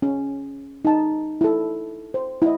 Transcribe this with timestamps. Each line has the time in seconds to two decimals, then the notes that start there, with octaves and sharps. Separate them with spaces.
0.02 C#4
0.85 D#4 A5
1.41 E4 A4
2.14 C5
2.42 E4 D#5